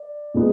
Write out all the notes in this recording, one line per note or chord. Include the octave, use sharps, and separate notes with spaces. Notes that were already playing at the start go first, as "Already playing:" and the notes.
Already playing: D5
A#2 G#3 B3